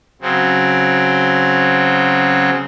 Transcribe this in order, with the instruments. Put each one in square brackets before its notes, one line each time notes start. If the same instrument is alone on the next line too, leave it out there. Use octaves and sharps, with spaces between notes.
[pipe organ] C#3 F#3 C4